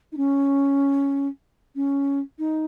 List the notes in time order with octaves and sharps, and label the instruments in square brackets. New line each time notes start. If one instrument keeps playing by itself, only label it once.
[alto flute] D#4
C#4
C#4
D#4